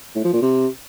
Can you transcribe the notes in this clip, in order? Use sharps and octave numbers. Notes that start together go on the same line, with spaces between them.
A2
F3
A#2
C3